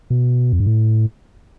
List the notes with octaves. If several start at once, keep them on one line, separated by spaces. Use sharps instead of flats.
B2
F2
G2
A2